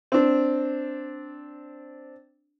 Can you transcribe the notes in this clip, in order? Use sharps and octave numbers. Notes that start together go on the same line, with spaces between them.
C4 D4